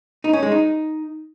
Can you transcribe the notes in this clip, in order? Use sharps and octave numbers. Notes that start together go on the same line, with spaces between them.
D#4
C#4
G#3
D#4